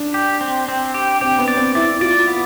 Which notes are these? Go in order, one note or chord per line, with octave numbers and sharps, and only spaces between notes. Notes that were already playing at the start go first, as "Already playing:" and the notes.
Already playing: D4
G4
C4
C4
G4
C4 G4
B3
D5
C4
E4 D5
F4 D5
B3